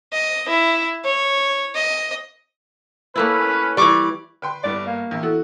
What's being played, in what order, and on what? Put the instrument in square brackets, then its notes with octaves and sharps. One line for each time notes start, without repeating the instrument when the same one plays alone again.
[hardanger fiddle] D#5
E4
C#5
D#5
[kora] A3 A#3 E4 [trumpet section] C#4 B4
[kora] E3 G3 [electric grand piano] D5 C#6 D6
[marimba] D3 [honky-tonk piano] B4 G5 C6
[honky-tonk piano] G1 G3 B3 [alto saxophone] D5
[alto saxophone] A#3
[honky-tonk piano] A#1 [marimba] E3 B3
[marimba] E4 A4 [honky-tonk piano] F#4